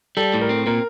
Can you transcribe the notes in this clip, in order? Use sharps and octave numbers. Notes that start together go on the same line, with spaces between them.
G3 A4
A2
A#4
C4
A#2 A#4